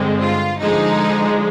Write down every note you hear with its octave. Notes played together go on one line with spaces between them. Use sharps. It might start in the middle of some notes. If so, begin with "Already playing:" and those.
Already playing: G2 D3 G#3 C4
F4
D3 F3 G#3 D#4